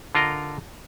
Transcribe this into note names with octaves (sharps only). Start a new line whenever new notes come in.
D3 F4 A#4 D#5 A#5